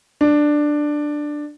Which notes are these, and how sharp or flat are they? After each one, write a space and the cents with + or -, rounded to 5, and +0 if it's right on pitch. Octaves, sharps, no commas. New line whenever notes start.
D4 +10